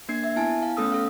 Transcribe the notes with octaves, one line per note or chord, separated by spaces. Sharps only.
A#3 D4 G#6 C7
E5
B3 E4 G#5 A5
F5
A3 B3 C#4 A4 D#6 E6
A4 F5